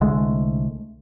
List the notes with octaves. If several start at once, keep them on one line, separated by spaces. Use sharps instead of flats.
C2 D3 G#3 A3